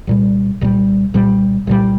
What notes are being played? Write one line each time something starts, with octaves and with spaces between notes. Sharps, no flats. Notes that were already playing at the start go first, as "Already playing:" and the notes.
C2 A#2 G3
C2 A#2 G3
C2 A#2 G3
C2 A#2 G3